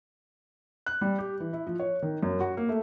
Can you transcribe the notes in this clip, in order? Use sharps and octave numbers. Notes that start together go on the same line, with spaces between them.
F#6
G3
G4
E3
E4
F3
C#5
D#3
F#2
F#4
A#3
A3